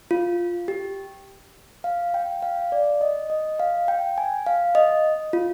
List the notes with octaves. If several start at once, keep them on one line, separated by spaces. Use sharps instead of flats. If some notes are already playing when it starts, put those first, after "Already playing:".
F4
G4
F5
G5
F5
D5
D#5
D#5
F5
G5
G#5
F5
D#5
F4